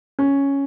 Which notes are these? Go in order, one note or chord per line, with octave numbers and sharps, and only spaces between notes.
C#4